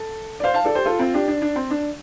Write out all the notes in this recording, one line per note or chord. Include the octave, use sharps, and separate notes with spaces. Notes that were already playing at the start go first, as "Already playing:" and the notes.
Already playing: A4
D5
C5 F5
F5 A5
A4 D5
G4 C5
F4 A4
C4 F4
D4 G4
D4
D4
C4
D4